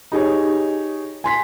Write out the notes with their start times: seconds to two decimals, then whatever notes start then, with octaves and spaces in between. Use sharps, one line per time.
0.12 D#4 G4 G#4 C#5
1.24 G#5 C6 B6